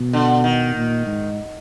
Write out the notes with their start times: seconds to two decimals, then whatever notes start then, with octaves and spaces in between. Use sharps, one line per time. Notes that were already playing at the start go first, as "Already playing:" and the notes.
Already playing: B2
0.13 D3
0.44 D#3
0.75 A#2
1.07 G#2